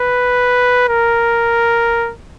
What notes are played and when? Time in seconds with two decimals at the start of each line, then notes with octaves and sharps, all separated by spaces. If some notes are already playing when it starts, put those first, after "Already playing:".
Already playing: B4
0.89 A#4